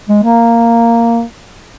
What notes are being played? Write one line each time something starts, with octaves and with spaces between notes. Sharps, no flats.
G#3
A#3